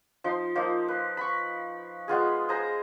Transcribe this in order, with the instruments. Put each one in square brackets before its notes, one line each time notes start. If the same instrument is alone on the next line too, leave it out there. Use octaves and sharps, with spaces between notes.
[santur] F3 D#4 C6
F3 A#3 D#4
B4
B5 C#6
G#3 B3 F4 G#4
G#4 C5 A#5